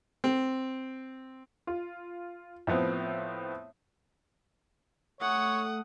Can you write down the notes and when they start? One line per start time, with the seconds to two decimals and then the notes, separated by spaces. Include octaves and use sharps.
0.24 C4
1.67 F4
2.67 A2 F3 B3 C4
5.21 A3 C#5 F#5 D#6